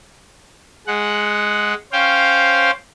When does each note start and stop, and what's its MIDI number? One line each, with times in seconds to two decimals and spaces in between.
0.87 1.74 56
0.87 1.74 78
1.93 2.71 61
1.93 2.71 72
1.93 2.71 77
1.93 2.71 79